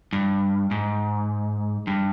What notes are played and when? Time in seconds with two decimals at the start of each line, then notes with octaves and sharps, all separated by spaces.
0.13 G2
0.71 G#2
1.87 G2